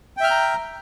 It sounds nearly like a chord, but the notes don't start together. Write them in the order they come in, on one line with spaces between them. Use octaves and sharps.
G5 E5 F6 G6 A#5